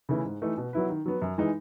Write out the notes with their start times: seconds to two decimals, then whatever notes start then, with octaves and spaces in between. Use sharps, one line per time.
0.09 C#3 E3 A3 E4
0.25 G#2
0.42 E3 A3 D#4
0.57 B2
0.73 F#3 B3 E4 B4
0.89 D#3
1.06 F#3 B3
1.22 F#2
1.38 E3 G#3 D#4